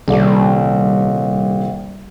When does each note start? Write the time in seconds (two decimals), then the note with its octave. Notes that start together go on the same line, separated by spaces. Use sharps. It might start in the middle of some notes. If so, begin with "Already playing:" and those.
0.08 D#1 C2 D5